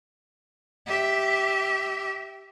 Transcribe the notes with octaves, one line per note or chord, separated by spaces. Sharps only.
G4 E5